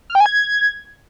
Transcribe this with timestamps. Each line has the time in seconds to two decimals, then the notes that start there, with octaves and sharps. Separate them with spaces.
0.10 F6
0.15 G5
0.20 G#5
0.26 G#6